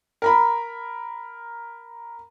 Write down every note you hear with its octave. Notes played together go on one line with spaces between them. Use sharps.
A#4 A#5 B5